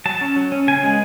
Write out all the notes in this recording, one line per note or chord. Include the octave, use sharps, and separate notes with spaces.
F#3 A5
C#4
F#3
C#4
C#3 G#5
G#3 B3